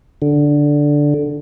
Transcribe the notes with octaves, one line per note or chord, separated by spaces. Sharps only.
D3